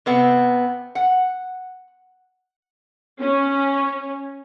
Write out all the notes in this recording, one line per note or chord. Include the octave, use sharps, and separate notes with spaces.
C3 B3 C4
F#5
C#4